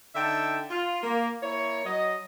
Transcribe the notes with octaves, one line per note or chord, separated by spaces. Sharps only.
D3 D#4 E5 G5 A5
F4
A#3
A#3 E4 C#5
F#3 D#5